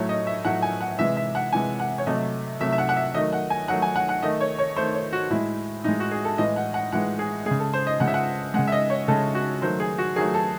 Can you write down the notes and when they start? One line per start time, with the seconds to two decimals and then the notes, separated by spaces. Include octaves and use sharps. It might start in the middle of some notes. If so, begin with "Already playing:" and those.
Already playing: A2 F#3 A3 C#5
0.09 D#5
0.27 E5
0.45 A2 F#3 A3 F#5
0.62 G#5
0.81 F#5
0.99 C3 E3 G#3 E5
1.17 E5
1.35 F#5
1.52 C3 E3 G#3 G#5
1.80 F#5
1.98 C#5
2.06 C3 F#3 A3 D#5
2.60 C3 F#3 A3 E5
2.72 E5
2.78 F#5
2.89 F#5
2.96 E5
3.14 D#3 F#3 A3 D#5
3.33 F#5
3.50 G#5
3.68 D#3 F#3 A3 F#5
3.82 G#5
3.96 F#5
4.09 F#5
4.22 D#3 A3 D#5
4.41 C#5
4.58 C#5
4.76 D#3 A3 C5
4.94 C#5
5.13 F#4
5.30 A2 G#3 E4
5.84 A2 G#3 D#4
6.00 F#4
6.11 G#4
6.25 A4
6.38 A2 E3 G#3 D#5
6.56 F#5
6.74 F#5
6.92 A2 E3 G#3 F#5
7.19 G#4
7.46 C#3 G#3 G#4
7.60 A4
7.73 C5
7.87 D#5
8.00 C#3 G#3 F#5
8.07 E5
8.14 F#5
8.54 C#3 G#3 F#5
8.67 E5
8.72 D#5
8.90 C#5
9.08 C#3 G#3 A4
9.35 F#4
9.62 D#3 F#3 A3 C5
9.80 G#4
9.98 F#4
10.16 D#3 F#3 A3 G#4
10.34 A4